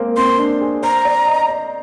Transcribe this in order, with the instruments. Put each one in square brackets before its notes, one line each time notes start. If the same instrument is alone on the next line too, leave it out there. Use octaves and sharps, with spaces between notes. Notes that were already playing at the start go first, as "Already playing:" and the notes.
Already playing: [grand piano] G#3 A#3 C4
[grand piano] C4 [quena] C6
[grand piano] D4
G#4
[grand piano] C5 [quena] A#5
[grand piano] D5
D#5
D5